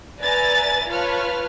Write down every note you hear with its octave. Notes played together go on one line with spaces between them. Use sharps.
B4 D5 E5 G#5 A#5 A6
F4 B4 C#5 A5 F6